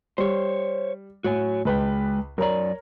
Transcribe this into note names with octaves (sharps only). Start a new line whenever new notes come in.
G3 C5 C#5
A2 F#4 C#5 G#5
C#2 G#3 B4 G5 B5
F#2 A#4 C#5 D5 A#5